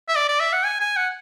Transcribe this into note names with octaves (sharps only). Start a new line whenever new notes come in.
E5
D5
D5
E5
F#5
G#5
G#5
F#5